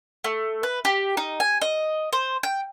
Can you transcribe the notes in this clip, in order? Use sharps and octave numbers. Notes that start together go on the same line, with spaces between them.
A3
B4
G4
D#4
G#5
D#5
C5
G5